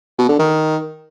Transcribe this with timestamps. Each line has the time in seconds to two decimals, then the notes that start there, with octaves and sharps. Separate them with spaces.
0.18 B2
0.29 D3
0.39 D#3